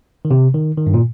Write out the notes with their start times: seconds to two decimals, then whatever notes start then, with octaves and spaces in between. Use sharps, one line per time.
0.25 D#3
0.31 C3
0.55 D#3
0.77 D#3
0.87 G2
0.94 A#2